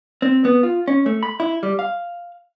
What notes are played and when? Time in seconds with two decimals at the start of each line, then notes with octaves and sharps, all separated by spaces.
0.22 C4
0.45 B3
0.63 F4
0.88 C#4
1.06 A3
1.23 B5
1.40 E4
1.63 G3
1.79 F5